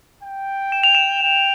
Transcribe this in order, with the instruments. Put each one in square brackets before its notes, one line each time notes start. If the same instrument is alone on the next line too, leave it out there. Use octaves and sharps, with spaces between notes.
[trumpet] G5
[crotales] E7
F7
E7
[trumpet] G5